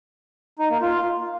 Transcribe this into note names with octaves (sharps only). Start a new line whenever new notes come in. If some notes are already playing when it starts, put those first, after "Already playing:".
D#4
A#3
F4